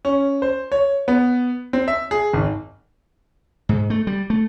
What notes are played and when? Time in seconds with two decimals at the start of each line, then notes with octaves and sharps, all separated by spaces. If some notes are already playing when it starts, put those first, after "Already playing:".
0.05 C#4
0.42 C5
0.72 C#5
1.08 B3
1.73 C4
1.88 E5
2.11 G#4
2.33 G#1
3.69 G#2
3.90 A3
4.07 G3
4.30 A3